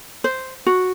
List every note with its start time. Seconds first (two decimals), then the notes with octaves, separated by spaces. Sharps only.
0.24 C5
0.66 F#4